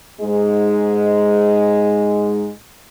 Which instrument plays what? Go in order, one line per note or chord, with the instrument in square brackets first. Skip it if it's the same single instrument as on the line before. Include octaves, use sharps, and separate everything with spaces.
[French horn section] G#2 G#3